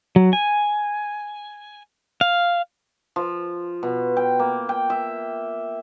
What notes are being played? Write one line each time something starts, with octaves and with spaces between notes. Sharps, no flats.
F#3
G#5
F5
F3
B2
G5
A#3
G5
E5